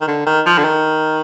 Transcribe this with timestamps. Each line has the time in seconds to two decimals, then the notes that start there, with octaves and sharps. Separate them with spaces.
0.02 D#3
0.08 D3
0.26 D#3
0.46 F3
0.58 D3
0.64 D#3